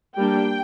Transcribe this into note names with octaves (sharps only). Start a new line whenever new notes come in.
G3 A#3 D4 G5